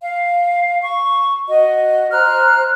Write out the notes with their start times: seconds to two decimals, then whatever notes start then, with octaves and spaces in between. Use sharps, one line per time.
0.03 F5
0.81 C#6
1.48 F#4 D#5
2.11 C5 A#5 F6 F#6